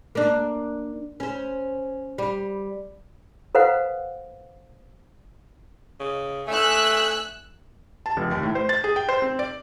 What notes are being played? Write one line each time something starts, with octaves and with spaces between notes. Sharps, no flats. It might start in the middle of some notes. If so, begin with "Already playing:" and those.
A#3 D4
C#4 C5
G3
A4 B4 C5 F5 F#5
C#3
A3 G#5 E6 F#6
A5
F1
D#2
A2
C5
A6
G#4
G5
C5
C4
D5